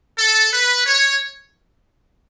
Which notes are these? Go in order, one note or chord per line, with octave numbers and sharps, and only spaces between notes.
A4
B4
C#5